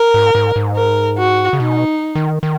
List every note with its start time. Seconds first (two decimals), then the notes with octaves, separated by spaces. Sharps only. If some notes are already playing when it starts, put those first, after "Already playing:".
Already playing: A#4
0.14 G#2
0.35 G#2
0.56 G#2
0.76 A#4
1.18 F#4
1.53 C#3
1.60 B2 D#4
2.15 D#3
2.43 D#3